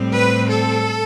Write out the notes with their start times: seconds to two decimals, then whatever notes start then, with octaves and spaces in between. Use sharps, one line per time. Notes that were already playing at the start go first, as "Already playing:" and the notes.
Already playing: A2 G3 C4
0.15 B4
0.49 A4